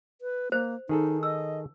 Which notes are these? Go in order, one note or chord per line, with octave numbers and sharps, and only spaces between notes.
B4
A#3 C5
D#3 D#4 G#4 A4
D#5 E6